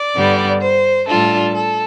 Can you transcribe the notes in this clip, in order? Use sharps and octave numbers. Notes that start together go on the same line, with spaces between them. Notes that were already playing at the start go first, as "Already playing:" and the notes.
Already playing: D5
G2 D3 G3 B3
C5
A2 G3 D4 F4 A4
A4